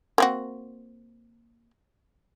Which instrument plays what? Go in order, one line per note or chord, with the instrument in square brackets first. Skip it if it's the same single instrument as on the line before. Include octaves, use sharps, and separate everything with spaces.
[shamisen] A#3 C4 F#4